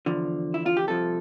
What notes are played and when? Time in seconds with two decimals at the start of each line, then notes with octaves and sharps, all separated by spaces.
0.06 E2 D3 F3
0.54 E4
0.66 F4
0.77 G4
0.87 C2 C3 F3 A4